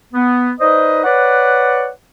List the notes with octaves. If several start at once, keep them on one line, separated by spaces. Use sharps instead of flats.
B3
D#4 B4 C5 D5 D#5
B4 C#5 D5 F#5